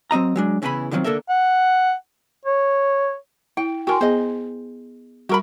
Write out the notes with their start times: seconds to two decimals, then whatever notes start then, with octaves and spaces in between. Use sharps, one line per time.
0.11 F#3 C4 D#5 A#5
0.36 F#3 G#3 D4
0.62 E2 C#3 E3 E4 G#5 B5
0.91 D3 D#3 F3 F#3 C4
1.04 D3 A#3 A4 A#4 E5
1.29 F#5
2.45 C#5
3.57 E4 G5
3.87 F#4 A#4 G5 G#5 C6
4.01 B3 G#4 C5 D#5
5.29 G3 F#4 A#4 A#5 B5